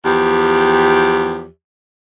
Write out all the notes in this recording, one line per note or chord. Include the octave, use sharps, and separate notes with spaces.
E2 F3 G4